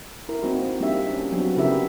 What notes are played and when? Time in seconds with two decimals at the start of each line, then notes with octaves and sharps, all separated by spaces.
0.29 E4 A#4
0.43 A#3 C4 D#4 F#4
0.80 G3 A#3 D4 D#4 G4 E5
1.14 C#4
1.32 F#3 B3 C4 D4 F#4
1.57 C#3 B3 E4 G4 A#4 E5